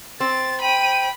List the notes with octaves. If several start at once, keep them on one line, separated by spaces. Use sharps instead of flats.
C4 A6
G5 B5 D#7